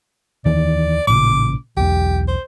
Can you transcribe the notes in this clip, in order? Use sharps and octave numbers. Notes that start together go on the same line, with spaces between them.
D#2 D#3 E3 D5
A1 A#2 C#3 D6
B1 E2 G4
C5